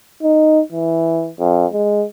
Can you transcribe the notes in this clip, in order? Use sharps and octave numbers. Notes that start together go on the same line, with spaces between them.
D#4
E3
F2
G#3